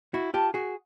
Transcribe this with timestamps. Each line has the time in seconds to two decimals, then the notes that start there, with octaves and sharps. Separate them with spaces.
0.14 E4 F#4
0.34 F4 G4 A5
0.54 F#4 G#4